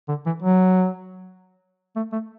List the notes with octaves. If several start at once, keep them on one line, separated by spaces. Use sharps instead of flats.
D3
E3
F#3
A3
A3